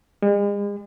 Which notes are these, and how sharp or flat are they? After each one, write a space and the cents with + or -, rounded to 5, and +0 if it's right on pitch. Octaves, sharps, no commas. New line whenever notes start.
G#3 -40